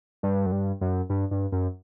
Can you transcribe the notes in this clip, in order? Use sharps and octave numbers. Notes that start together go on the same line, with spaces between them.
G2
F#2
G2
F#2
G2
G2
F#2